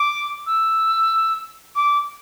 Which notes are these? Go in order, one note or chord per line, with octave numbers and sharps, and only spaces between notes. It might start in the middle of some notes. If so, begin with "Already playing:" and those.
Already playing: D6
E6
D6